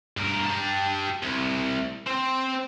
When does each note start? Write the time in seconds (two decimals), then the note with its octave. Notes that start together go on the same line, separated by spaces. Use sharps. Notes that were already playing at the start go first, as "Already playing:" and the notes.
0.17 G2 A#4
0.46 G4 A5
1.23 C2
2.07 C4